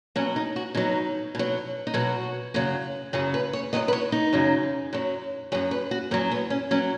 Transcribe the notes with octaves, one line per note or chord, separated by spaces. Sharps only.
B2 F#3 C#4
D#4
F#4
B2 F#3 D#4
B2 F#3
D#4
B2 F#3 F#4
F#2 C#3 F#3
F#2 C#3 F#3 G#4
B4
C#5
F#2 C#3 F#3 D#5
B4
C#5
D#4
F#2 C#3 F#3
F#2 F#3
F#2 F#3 G#4
B4
F#4
F#2 F#3 C#4
B3
C#4
F#3 C#4